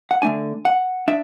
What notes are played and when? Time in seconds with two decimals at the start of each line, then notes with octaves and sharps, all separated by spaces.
0.11 F#5
0.22 D3 A3 D4 G#5
0.65 F#5
1.08 D4 E5